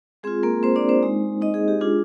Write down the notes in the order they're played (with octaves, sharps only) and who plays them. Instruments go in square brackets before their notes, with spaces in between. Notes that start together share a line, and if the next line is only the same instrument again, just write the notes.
[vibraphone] G#3 C4 F4 G#4
A#3 A#4
C4 C5
D4 D5
C4 C5
G#3 D#4
D#4 D#5
G#4
G4
G#3 D4 F4 G#4